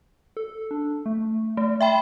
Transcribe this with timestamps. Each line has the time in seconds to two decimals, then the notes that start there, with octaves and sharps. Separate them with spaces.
0.37 A4
0.71 D4
1.06 A3
1.57 A3
1.81 E5 G5 B5 C6